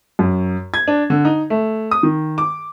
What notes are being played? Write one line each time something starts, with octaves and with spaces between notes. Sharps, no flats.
F#2
G#6
D4
D3
D#4
A3
D#6
D#3
D6